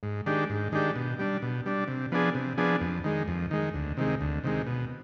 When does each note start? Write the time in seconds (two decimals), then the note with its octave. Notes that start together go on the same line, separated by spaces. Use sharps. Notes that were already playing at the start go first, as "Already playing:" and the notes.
0.03 G#2
0.26 D#3 G#3 D4 G4
0.50 G#2
0.72 D#3 G#3 D4 G4
0.96 B2
1.19 G3 D4
1.42 B2
1.66 G3 D4
1.88 C3
2.12 F3 B3 D4 G#4
2.35 C3
2.57 F3 B3 D4 G#4
2.81 F2
3.04 D#3 G#3
3.28 F2
3.51 D#3 G#3
3.74 D2
3.97 C3 D#3 G#3
4.21 D2
4.44 C3 D#3 G#3
4.67 B2